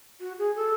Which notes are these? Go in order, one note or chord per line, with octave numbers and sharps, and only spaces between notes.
F#4
G#4
A4